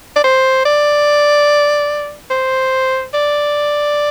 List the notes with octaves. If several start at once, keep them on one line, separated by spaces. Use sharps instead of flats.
D5
C5
D5
C5
D5